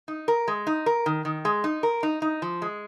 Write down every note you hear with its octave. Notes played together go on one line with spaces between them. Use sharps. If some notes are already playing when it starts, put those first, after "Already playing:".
D#4
A#4
G#3
D#4
A#4
D#3
D#3
G#3
D#4
A#4
D#4
D#4
F3
G#3